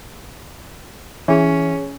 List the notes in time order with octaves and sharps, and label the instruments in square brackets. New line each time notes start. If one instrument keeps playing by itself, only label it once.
[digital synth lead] E3 [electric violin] C#4 [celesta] G#4 C#5